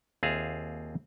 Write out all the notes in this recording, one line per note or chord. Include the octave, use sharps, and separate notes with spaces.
D#2 C4 F4 G#4 E5 F5